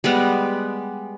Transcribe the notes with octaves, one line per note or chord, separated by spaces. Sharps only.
G3 G#3 B3